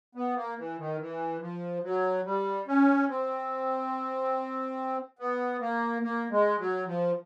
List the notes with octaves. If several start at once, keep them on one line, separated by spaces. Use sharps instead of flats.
B3
A#3
E3
D#3
E3
F3
F#3
G3
C#4
C4
B3
A#3
A#3
G#3
F#3
F3